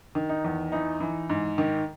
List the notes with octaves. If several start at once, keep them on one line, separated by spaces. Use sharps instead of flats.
D#3
D#4
E2
E3 D#4
E3
G#2
D#3